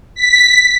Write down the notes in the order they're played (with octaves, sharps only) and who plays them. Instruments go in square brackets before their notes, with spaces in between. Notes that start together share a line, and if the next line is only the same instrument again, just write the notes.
[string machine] B6